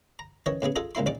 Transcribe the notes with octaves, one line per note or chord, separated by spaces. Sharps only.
A#5
D#3 E3 C#4 C#5 D#5
A2 C#3 B3 G#4
F4 G#4 A4 D#5 F#5
C#2 A#2 A#3 E4 C6
A#1 D#2 D#4 D5 D6